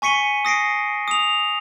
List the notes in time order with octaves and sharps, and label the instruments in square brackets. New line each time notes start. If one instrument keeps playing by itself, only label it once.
[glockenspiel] G#5 C#6 B6 C#7 D#7 G7
D#6 A#6 C7 D7
D#6 F7